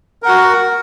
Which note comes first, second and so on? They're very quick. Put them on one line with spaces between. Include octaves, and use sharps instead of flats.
A#4 F#5 F#4